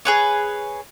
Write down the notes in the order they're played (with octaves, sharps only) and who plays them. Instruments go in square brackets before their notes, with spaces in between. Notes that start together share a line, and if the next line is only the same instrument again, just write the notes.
[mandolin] G#4 B4 C#5